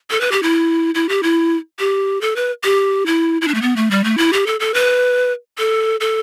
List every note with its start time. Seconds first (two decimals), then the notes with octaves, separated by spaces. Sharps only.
0.11 A4
0.21 B4
0.32 G4
0.43 E4
0.95 E4
1.09 G4
1.23 E4
1.79 G4
2.21 A4
2.36 B4
2.64 G4
3.06 E4
3.42 E4
3.48 D4
3.54 A3
3.62 B3
3.76 A3
3.91 G3
4.04 A3
4.18 E4
4.33 G4
4.47 A4
4.60 A4
4.74 B4
5.58 A4
6.00 A4